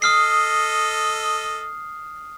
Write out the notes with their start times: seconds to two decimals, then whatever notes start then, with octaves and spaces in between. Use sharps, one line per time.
0.02 A4 D#5 D#6 F6 C7